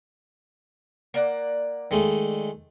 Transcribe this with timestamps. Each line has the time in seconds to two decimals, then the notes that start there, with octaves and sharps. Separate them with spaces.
1.14 A#3 D5 F#5
1.91 D#3 G#3 A3